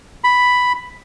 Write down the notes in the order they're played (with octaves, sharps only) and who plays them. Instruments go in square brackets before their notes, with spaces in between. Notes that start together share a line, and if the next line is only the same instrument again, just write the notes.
[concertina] B5